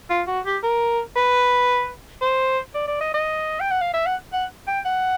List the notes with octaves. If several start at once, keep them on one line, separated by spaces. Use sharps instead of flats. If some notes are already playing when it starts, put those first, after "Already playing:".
F4
F#4
G4
A#4
B4
C5
D5
D5
D#5
D#5
G5
F#5
F5
E5
F#5
F#5
G5
F#5